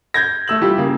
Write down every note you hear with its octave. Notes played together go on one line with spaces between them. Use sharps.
G6 G#6 A#6
A3 E6 F#7
E3 G3 F4 G4
C#3 A#3